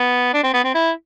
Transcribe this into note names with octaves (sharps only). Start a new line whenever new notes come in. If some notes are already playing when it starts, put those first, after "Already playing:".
Already playing: B3
D4
C4
B3
C4
E4